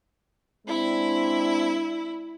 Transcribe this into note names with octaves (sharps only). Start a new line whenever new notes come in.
G#3 C4 D4 E4